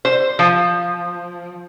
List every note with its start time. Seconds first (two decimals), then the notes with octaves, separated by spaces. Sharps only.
0.05 C5
0.39 F3